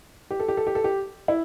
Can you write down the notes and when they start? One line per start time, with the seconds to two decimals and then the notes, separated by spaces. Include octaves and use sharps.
0.30 G4
0.40 A4
0.48 G4
0.57 A4
0.67 G4
0.75 A4
0.84 G4
1.28 E4